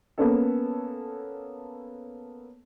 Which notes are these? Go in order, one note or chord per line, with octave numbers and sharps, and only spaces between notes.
A#3 B3 C#4 A4